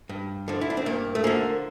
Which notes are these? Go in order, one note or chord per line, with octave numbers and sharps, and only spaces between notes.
G2
D3 F3
E4
D4
C4
G2 A#3
A3
D3 F3 A#3